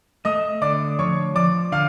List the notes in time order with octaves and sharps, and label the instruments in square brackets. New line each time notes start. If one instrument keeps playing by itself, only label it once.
[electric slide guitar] A3 [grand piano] D#5 D#6
[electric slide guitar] D3 [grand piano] D5 D6
[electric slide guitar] F3 [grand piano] C#5 C#6
[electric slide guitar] F3 [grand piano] D5 D6
[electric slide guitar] D3 [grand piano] F5 F6